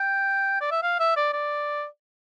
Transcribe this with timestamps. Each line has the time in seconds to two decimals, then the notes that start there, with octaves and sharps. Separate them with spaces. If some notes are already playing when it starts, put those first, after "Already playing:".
Already playing: G5
0.61 D5
0.71 E5
0.83 F5
1.00 E5
1.16 D5
1.33 D5